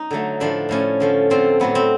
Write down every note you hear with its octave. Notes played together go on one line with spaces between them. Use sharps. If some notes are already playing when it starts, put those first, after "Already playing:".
Already playing: D#4
D3 F#3 A3
A2 F3 A3 D4
A2 F3 A3 C#4
D3 F3 A3
D3 F3 A3 C4
A2 F#3 A3 B3
C4